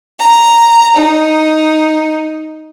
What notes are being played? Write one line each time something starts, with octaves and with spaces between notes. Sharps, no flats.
A#5
D#4